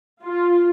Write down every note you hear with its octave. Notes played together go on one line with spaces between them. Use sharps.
F4